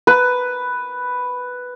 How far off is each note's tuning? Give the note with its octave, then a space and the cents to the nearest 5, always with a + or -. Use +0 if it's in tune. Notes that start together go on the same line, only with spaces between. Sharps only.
B4 +5